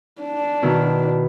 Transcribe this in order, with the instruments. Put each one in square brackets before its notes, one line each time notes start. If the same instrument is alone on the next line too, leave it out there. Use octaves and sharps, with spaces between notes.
[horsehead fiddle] D4
[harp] B2 D#3 E4